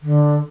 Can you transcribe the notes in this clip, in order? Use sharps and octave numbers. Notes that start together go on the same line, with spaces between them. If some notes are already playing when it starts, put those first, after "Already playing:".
D3